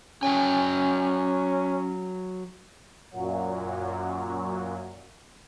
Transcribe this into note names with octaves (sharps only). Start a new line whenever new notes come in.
F#3 C#4 G5 G#5
F#2 A#2 F#3